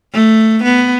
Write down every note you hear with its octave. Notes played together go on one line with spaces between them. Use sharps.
A3
B3